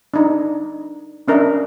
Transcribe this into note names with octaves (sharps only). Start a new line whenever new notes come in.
D4 D#4
C#4 D4 A#4 D#5 E5